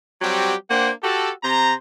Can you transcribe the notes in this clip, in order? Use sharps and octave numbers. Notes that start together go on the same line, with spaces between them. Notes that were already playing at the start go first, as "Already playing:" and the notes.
F#3 G3 C4 F#4 G4
A#3 D4 C5 F#5 G5
F#4 G4 A4
C3 C5 A#5